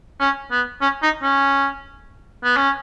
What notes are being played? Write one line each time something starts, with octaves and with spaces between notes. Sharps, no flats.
C#4
B3
C#4
D#4
C#4
B3
C#4